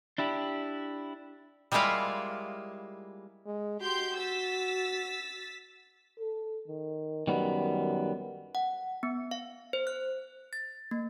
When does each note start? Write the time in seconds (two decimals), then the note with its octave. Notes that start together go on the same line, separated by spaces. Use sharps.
0.18 D4 E4 G4
1.72 G3 G#3 A#3 E4 F4 F5
3.46 G#3
3.81 F#4 G4 C6 G6
4.18 E6 A6 B6
6.20 A4
6.68 D#3
7.27 F#2 D#3 G3 B3
8.55 F#5
9.03 B3
9.31 F5
9.73 C5
9.87 F#6
10.53 A6
10.91 A#3